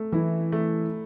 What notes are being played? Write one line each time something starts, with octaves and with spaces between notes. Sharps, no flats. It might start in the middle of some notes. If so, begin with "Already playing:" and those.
Already playing: A3
E3 E4
A3